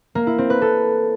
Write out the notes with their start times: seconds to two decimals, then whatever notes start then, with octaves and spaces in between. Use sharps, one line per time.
0.15 A#3
0.27 E4
0.38 C4
0.50 B4
0.62 A4